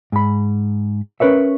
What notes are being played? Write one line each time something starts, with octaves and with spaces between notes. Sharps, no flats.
G#2 B5
C#4 A#4 B4 C#5 E5